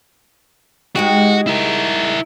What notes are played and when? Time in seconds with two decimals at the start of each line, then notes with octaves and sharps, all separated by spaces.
0.96 G#3 D#4 F#4 G4
1.47 E4 A#4